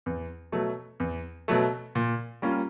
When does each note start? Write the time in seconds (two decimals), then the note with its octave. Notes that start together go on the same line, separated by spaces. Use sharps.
0.06 E2
0.52 B2 F#3 A3
1.00 E2
1.48 B2 F#3 A3
1.95 A#2
2.42 G3 A#3 C#4 F4